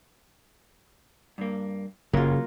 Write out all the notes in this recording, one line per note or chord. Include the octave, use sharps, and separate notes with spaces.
G2 A#3
F#1 C#3 F#3 A#3 F4